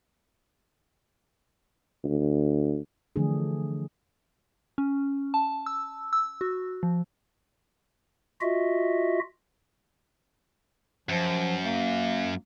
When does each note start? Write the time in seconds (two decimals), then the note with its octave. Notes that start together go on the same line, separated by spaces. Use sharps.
2.04 D2
3.16 D3 E3 F3 A3 D4 G#4
4.78 C#4
5.34 A5
5.66 E6
6.13 E6
6.41 F#4
6.83 F3
8.41 F4 F#4 D#5 E5
11.09 F#2 F3
11.63 A#3